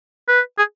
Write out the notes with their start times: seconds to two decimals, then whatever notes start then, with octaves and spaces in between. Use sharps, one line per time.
0.28 B4
0.58 G#4